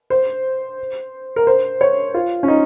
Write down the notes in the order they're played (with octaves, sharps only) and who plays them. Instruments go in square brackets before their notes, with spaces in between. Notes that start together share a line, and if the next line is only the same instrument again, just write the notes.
[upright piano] C5
A#4
C5
C#5
F4
C#4
D#4